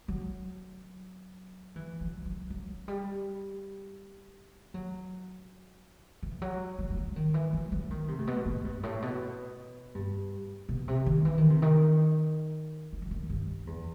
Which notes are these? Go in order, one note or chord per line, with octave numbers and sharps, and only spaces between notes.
F#3
E3
F#3
F#3
F#3
G3
F#3
E3
F#3
F#3
F#3
E3
D#3
E3
F#3
F#3
D#3
C3
A2
B2
A2
G2
A2
B2
G2
B2
C3
D#3
E3
D#3
C3
D#3
D#3
E3
D#3
G2
E2